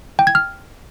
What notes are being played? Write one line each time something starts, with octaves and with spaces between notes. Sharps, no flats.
G5
G#6
F6